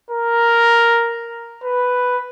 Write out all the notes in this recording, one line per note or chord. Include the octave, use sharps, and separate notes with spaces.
A#4
B4